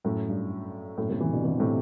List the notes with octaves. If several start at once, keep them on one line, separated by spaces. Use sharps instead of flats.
F#2 A2
G2
F#2 A2
A2 C3
C3 E3
B2 D3
C3 E3
A2 C3